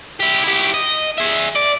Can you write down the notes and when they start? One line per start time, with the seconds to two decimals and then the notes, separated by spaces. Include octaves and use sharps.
0.20 E4 G4
0.44 E4 G4
0.74 D#5
1.18 G#4 E5
1.56 D5